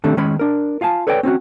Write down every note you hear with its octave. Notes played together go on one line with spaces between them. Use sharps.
D#3 G3 A3 C4 D4
D#3 G#3 C#4 B5
D4 A#4
F4 F5 G#5 A5
A4 B4 C#5 D5 G5
C4 C#4 F4 F#4